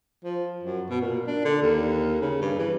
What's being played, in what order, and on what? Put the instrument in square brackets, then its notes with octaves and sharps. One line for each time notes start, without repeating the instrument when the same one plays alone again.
[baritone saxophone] F3
F#2
B2
A#2
D4
D3
D#2
C#3
G2
E3